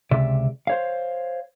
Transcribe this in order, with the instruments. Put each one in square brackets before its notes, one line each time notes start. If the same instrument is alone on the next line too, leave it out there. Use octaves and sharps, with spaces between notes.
[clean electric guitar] C#2 C3 D5 E5
C5 C#5 F5